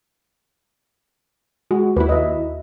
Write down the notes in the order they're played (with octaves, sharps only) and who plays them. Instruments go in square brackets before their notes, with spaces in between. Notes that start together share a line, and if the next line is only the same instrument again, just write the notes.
[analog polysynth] G#3 [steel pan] F#4
[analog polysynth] D#2 E4 [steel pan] B4
[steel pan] D#5 E5